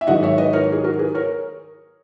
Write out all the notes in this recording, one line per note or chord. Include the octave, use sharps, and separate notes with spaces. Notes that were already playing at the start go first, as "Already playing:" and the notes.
E5
G#2 D#3 F#3 D#5 F#5
C#5 E5
B4 D#5
A#4 C#5
G#4
F#4 A#4
G#4 B4
A#4 C#5